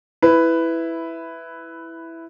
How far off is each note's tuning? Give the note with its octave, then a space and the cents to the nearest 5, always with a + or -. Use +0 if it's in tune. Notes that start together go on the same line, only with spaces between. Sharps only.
E4 +0 B4 +10